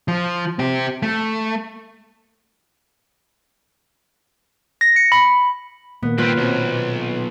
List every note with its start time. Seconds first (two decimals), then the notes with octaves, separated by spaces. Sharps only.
0.08 F3
0.59 C4 G4
1.02 A3
4.81 A#6
4.96 C#7
5.12 B5
6.03 A#2 D#3 A#3 B3
6.18 G2 C4 F4 B4
6.37 B1 C4 F#4 C#5